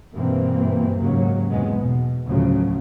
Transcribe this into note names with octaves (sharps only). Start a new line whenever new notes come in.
G2 B2 E3 A#3 C4
D#2 G#2 C#3 F#3 A#3
E2 G#2 C3 G#3 B3
B2
D2 A2 C#3 F3 F#3